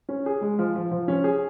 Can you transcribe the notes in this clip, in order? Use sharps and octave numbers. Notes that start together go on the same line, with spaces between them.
C#4
G#4
G#3
F3
F3
F3
C#4
G#4